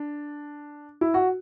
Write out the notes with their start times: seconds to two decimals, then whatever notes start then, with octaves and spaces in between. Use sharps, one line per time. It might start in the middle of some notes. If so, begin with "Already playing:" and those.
Already playing: D4
1.01 E4
1.14 F#4